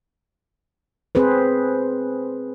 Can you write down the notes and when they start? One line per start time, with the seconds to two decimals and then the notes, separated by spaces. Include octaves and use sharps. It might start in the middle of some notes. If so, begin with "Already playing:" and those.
1.15 C4 G#4 B4 C5